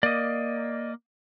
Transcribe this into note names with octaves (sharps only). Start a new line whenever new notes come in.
A#3 D5 D#5